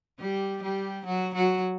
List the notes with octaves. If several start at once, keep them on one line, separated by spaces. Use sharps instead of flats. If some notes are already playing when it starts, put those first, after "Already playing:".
G3 G4
G3 G4
F#3 F#4
F#3 F#4